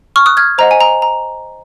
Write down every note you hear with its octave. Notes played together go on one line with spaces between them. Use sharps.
C#6 F6
D#6 F#6
F6 G#6
C5 D#5 F#5 A#5
G#5
A#5
A#5